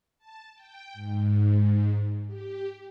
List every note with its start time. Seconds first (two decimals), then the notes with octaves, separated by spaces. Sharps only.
0.18 A5
0.55 G5
0.93 G#2
2.27 G4